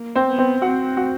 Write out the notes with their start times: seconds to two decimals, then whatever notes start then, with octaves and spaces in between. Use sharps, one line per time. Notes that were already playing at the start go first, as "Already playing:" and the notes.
Already playing: A#3
0.15 C4 C5
0.27 B3
0.38 C4 C5
0.61 C4 F#4 F#5
0.97 F#4 F#5